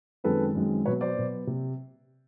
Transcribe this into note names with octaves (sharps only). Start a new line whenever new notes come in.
F#2 D#3 G#3 C4 A4 B4
F#2 D#3 G#3 C4
B2 F#3 B3 B4 C#5
C5 D5
B2 F#3 B3
C3